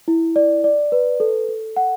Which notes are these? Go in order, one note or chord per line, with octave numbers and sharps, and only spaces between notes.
E4
D5
D5
B4
A4
A4
F#5